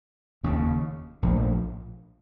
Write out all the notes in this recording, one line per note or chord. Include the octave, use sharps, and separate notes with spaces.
F1 D#2 C#3
A#1 A2 F3